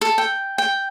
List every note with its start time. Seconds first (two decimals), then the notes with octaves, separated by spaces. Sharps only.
0.01 A4
0.18 G5
0.58 G5